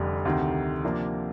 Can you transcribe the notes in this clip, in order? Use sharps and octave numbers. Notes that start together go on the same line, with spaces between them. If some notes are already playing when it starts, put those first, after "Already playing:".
Already playing: F1 F2 D3 G3
D2 C3 D#3
C3 F3 A#3 D4